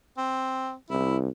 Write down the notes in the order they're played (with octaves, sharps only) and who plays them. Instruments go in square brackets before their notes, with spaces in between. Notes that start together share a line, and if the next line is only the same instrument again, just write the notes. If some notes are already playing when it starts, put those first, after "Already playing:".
[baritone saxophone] C4
[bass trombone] C2 [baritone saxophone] E4